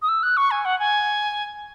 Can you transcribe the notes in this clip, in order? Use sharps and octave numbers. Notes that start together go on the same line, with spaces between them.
D#6
E6
F#6
C#6
G#5
F#5
G#5